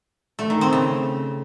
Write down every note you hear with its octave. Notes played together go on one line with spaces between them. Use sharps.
A3
D#3
C4
C#3